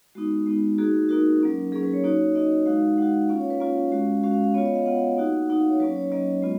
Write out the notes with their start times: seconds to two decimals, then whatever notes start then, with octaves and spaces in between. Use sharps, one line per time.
0.15 G#3 B3 D#4 F#4
0.46 G#3 B3 D#4
0.78 A#3 D#4 F#4 G#4
1.09 A#3 D#4 F#4 A#4
1.41 F#3 A#3 C#4
1.72 F#3 A#3 C#4 G#4
1.83 B4
1.93 C#5
2.04 A#3 D#4 F#4
2.35 A#3 D#4 F#4 D#5
2.66 G#3 D#4 F#4 F5
2.98 G#3 D#4 F#4 F#5
3.29 A#3 C#4 F4 F5
3.40 C#5
3.50 B4
3.60 A#3 C#4 F4 F5
3.92 G#3 C#4 F#4
4.23 G#3 C#4 F#4 F5
4.33 F5
4.44 F5
4.54 B3 F4 C#5
4.65 D#5
4.75 F5
4.86 B3 F4 F#5
5.18 A#3 D#4 F#4
5.49 A#3 D#4 F#4 F#5
5.60 F5
5.70 C#5
5.80 F#3 A#3 C#4 B4
5.96 C#5
6.12 F#3 A#3 C#4 D#5
6.42 G#3 B3 F4